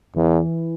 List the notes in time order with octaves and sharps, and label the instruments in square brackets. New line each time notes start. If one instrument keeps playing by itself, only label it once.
[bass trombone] E2 [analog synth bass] E3